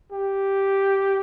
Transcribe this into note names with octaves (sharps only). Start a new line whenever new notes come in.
G4